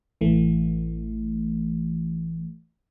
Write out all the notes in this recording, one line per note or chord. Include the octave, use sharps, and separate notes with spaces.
A1 E3 A3